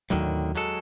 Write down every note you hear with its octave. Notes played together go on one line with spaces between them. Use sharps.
D#2 A2 D3 D#3 F#3
F#3 G#3 A4